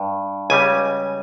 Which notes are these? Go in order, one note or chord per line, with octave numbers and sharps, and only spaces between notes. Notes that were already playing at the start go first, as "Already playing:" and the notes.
Already playing: G2
C#2 C#3 G3 G#5